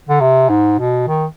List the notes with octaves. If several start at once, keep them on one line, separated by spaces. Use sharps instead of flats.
D3
C3
G#2
B2
D#3